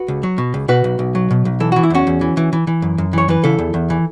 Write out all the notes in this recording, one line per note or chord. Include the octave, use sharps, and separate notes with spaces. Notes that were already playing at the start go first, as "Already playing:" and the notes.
Already playing: F#4 B4
C#2
F#3
B2
C#2
B2 F#4 B4
B1
B1
F#3
B2
B1
E3 A4
E3 F#4
E4
E2 C#4 F#4
E2
E3
E3
E3
E3
F#2
F#2
E3 C#5
E3 B4
C#3 E4 A4
E2
E2
E3